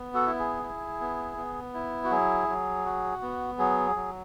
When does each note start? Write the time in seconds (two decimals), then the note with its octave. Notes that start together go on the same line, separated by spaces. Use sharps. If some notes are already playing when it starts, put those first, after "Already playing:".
Already playing: B3
0.14 F#4 A4
0.26 E4
0.39 G#4
0.63 E4
1.00 B3
1.37 B3
1.74 E4
2.04 F#4
2.11 F#3 G#4
2.48 F#3
2.86 F#4
3.22 B3
3.59 F#3 G#4
3.96 F#3